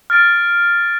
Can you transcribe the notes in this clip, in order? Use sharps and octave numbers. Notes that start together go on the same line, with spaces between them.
F6 A6 D7